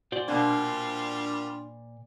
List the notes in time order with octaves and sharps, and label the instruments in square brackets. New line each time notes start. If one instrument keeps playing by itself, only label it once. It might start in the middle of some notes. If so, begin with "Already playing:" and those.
[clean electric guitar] A#2 C5 D5 [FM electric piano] F#4
[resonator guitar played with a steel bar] B2 A#3 [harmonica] G3 C4 F4 [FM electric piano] D4